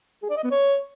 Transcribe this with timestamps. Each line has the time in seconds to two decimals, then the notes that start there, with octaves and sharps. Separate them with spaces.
0.23 G#4
0.30 D5
0.37 D#5
0.44 B3
0.51 C#5